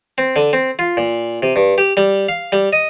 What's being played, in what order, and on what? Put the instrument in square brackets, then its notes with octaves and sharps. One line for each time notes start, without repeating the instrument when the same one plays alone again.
[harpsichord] C4
D3
C4
F4
A#2
C3
G2
G4
G3
F5
G3
D#5